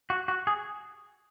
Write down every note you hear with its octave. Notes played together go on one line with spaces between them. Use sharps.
F#4
F#4
G#4